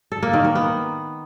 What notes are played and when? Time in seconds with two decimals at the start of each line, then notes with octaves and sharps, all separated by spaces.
0.12 A4
0.23 A#3
0.34 D#3
0.44 A#3
0.55 B3